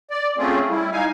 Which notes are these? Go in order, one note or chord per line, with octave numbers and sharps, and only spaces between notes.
D5
A3 C4 C#4 F4 G#4
G3 E4
D#4 F5 G#5